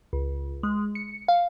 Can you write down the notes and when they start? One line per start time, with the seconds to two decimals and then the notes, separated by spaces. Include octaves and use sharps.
0.13 C#2
0.63 G#3
0.95 C#7
1.28 F5